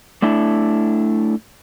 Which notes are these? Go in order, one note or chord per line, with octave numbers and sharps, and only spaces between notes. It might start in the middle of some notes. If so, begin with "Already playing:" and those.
A3 D4 E4